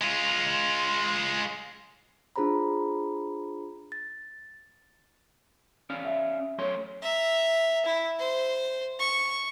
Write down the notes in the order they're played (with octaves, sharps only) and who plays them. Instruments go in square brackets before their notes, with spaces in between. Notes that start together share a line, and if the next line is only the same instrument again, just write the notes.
[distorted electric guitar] G#3 F4
[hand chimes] D4 F4 G#4 C5 A#5 B5
A6
[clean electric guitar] C#4 D5 F5
[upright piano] E5
[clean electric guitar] F#2 A3 C6 [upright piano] C#5
[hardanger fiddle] E5 A#5
E4
C5
C#6